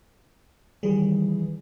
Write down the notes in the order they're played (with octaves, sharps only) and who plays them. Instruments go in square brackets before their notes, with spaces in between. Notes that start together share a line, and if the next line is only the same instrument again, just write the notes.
[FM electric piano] D#3 G3 G#4 [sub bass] E3